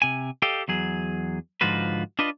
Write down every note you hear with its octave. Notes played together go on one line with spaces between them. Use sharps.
C3 G#5
G4 A4 D#5 F5 G5
E2 F#3 G#4
G#2 D3 F3 F4 F#4 B4
D4 F4 B4 D#5